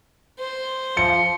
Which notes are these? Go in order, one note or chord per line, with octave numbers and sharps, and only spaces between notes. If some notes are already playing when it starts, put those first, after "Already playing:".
C5
F3 C#7